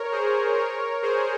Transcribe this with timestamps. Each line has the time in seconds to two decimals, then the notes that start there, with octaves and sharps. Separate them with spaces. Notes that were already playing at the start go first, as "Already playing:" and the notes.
Already playing: A#4 C#5
0.12 G#4 C5
0.57 A#4 C#5
1.02 G#4 C5